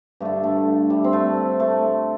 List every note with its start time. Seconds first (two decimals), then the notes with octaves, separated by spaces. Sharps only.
0.20 G2 D3 A3
0.43 A3
0.90 G3
1.04 C4
1.13 A3
1.60 A3